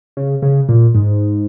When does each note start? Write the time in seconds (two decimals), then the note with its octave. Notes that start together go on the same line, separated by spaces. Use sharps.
0.17 C#3
0.42 C#3
0.69 A#2
0.95 G#2